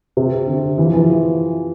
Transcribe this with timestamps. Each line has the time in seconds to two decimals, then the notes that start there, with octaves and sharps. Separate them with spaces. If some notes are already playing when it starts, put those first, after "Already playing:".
0.17 C3
0.47 D3
0.78 E3
0.86 F3
0.93 E3